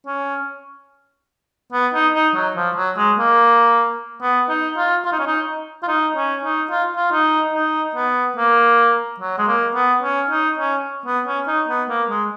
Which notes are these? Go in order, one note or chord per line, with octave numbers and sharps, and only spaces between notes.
C#4
B3
D#4
D#4
F#3
F3
F#3
G#3
A#3
B3
D#4
F4
F4
D#4
C#4
D#4
F4
D#4
C#4
D#4
F4
F4
D#4
D#4
B3
A#3
F#3
G#3
A#3
B3
C#4
D#4
C#4
B3
C#4
D#4
B3
A#3
G#3